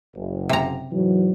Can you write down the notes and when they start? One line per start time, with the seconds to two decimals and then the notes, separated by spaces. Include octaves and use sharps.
0.14 F#1
0.49 C3 A#5
0.92 G#2 E3 F#3